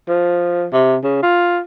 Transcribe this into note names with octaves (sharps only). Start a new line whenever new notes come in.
F3
C3
C#3
F4